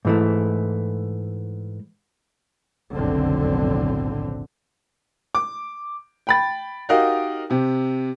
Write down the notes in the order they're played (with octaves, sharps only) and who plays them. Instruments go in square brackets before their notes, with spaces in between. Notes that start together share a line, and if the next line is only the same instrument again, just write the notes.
[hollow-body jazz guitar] G#2 E3 A3
[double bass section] F#1 B1 F2 A2 D3 C4
[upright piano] D6
G5 B5 A6
D#4 F#4 G4 A#4 D#5 F5
C3 G4